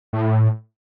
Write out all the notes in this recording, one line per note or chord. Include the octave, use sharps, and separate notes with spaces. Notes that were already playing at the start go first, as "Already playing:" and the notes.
A2